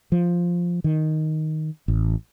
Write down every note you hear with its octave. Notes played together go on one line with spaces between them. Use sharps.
F3
D#3
A1